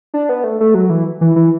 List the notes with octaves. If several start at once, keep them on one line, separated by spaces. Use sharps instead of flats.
D4
B3
A3
A3
F#3
E3
E3
E3